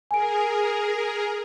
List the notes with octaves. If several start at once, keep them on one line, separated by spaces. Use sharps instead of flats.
G#4 A#4 G#5 D7